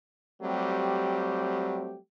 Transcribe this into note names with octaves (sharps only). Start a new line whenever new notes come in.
F#3 G3 A3 C4 G4